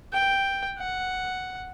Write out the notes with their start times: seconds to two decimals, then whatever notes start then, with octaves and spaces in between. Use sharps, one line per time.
0.13 G5
0.79 F#5